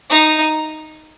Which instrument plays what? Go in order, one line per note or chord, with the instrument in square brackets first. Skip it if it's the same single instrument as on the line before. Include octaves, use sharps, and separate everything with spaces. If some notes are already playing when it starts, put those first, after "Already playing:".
[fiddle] D#4